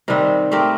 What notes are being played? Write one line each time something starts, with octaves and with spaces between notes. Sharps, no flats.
C3 D#3 G3 C4
A3 C4 G4 A#4